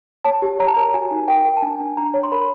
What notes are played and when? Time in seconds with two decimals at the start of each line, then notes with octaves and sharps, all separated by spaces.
0.25 C#5 A5
0.42 G4
0.59 C#5 A#5
0.67 A5
0.74 A#4 A#5
0.94 F#4 G#5
1.11 D#4
1.28 A#4 G5
1.45 A#4
1.57 A5
1.62 D4 G#5
1.80 D4
1.97 D4 A#5
2.14 C#5
2.23 C6
2.32 A#4 B5